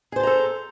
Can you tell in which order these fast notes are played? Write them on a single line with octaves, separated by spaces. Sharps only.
G#4 C5 A5 A#5 A4